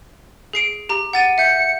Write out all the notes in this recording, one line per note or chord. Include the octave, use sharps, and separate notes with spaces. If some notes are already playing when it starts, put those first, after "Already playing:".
G#4 C7 D7
G4 A#5
F#5 A6 D#7
E5 G6 C#7